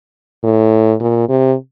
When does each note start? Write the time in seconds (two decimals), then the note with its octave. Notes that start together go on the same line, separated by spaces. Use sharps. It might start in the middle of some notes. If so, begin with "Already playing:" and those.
0.44 A2
1.00 A#2
1.29 C3